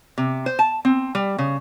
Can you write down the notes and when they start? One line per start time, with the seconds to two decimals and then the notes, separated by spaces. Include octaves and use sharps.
0.18 C3
0.46 C5
0.59 A5
0.85 C4
1.15 G3
1.38 C#3